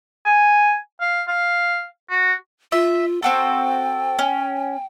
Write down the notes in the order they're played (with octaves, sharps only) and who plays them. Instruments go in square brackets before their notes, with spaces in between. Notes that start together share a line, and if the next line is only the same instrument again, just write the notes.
[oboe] G#5
F5
F5
F#4
[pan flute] F4 [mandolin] E5
[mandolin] C4 F#4 A4 [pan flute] G5
[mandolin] C#4